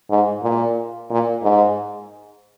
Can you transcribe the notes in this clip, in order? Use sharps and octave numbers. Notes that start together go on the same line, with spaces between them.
G#2
A#2
A#2
G#2